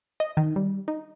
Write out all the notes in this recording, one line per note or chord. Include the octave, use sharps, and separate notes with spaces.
D#5
D#3
G3
D#4